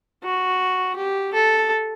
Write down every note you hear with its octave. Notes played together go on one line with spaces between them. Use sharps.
F#4
G4
A4